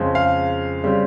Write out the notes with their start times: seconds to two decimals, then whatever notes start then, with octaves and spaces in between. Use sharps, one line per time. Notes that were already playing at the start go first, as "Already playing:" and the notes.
Already playing: F2 C#3 G#3 C4
0.15 F5
0.84 C#3 G3 C4